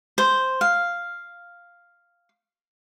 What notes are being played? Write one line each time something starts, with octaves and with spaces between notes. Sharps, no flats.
C5
F5